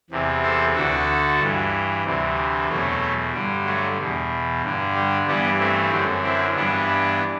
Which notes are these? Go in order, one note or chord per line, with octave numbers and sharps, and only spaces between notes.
E2 C3 E3
A4 C5
D2 D3 F#4 A4
G2 E3
D2 C3 E3
E2 B2 F#3 A3
G2 D3 G3
F#3 A3
E2 B2
G2 D3
G3
G2 E3 G3 B3
A3 C4
F#2 D3
C4 E4
G2 E3 B3 D4